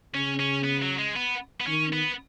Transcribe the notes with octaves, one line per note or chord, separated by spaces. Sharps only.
C#3 C#4
C#4
B3
F#3
G#3
B3
B3
D#3 C#4
B3